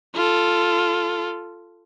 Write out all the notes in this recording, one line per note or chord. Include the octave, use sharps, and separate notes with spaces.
F4 A4